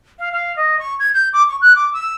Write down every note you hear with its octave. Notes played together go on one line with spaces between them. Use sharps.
F5
F5
D#5
C#6
G#6
G6
D6
C#6
F#6
D6
E6